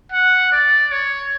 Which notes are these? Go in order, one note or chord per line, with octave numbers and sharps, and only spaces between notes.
F#5
D5
C#5